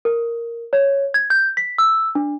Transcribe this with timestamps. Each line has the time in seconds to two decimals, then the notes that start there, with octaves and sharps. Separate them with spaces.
0.05 A#4
0.73 C#5
1.14 G#6
1.30 G6
1.57 B6
1.78 E6
2.15 D4